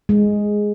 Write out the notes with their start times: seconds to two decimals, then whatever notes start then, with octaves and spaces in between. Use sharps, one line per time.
0.09 G#3